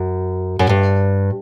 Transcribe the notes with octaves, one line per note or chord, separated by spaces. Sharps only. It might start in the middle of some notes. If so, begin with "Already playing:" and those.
Already playing: F#2
F#2
G2